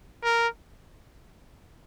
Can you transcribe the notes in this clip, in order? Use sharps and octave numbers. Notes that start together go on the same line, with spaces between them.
A#4